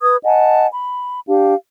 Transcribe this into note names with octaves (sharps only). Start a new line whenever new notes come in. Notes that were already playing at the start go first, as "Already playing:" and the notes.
B4 D#6 G#6
D#5 F#5 G#5 A5
B5
D4 G4 F5